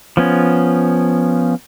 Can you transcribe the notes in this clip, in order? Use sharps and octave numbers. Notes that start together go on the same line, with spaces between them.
F3 B3 C#4